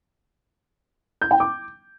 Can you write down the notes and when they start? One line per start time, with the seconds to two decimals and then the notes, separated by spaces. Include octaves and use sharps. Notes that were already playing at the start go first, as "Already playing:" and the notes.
1.21 G6
1.31 G5
1.40 D6